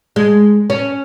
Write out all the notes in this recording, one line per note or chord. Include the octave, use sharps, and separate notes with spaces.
G#3
C#4